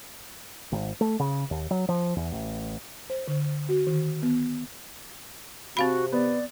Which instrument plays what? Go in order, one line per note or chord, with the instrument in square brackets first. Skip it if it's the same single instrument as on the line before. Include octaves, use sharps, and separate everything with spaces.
[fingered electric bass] G#1
A3
C#3
D#2
F#3
F3
E2
A1
[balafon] C5
D3
F#4
D#3
B3
[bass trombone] C3 [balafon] C4 F5 B5 [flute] F#4
[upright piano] B3 [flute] D5